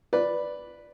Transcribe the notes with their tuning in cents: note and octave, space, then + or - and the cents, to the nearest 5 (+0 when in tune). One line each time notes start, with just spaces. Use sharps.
B4 +0 D5 +0